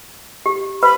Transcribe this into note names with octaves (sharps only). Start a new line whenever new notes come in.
G4
B4 B5